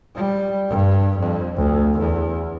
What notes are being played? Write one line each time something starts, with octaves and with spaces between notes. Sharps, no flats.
G3
G2
F2
D2
E2